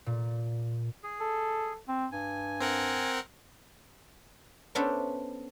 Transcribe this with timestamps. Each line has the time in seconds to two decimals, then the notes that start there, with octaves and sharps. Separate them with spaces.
0.06 A#2
1.03 G#4
1.20 A4
1.88 C4
2.12 G2 G#5
2.60 C4 A#4 F#5
4.75 B3 C#4 D4 A4 C5 E5